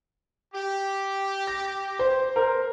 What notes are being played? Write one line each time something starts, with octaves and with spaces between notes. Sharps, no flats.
G4
A#6
C5
A#4 C5